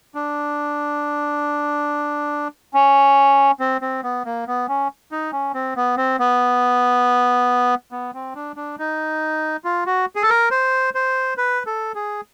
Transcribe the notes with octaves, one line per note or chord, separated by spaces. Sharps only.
D4
C#4
C4
C4
B3
A#3
B3
C#4
D#4
C#4
C4
B3
C4
B3
B3
C4
D4
D4
D#4
F4
F#4
G#4
A4
A#4
C5
C5
B4
A4
G#4